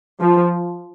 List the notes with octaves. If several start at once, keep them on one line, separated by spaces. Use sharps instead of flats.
F3